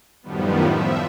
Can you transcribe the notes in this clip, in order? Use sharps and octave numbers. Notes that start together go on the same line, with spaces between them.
F#2 A2 D#3 F3 G3 B3
F3 E5